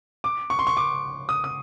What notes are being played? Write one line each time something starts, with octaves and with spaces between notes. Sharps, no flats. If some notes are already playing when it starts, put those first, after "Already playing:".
D6
C#6
C6
C#6
D6
D#6
D#6